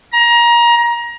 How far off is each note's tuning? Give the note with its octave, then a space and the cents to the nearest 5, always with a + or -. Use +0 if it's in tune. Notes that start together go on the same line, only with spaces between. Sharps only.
A#5 +25